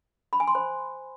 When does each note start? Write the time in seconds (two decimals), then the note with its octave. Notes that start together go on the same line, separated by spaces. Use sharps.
0.33 B5
0.40 G#5
0.47 C6
0.55 C5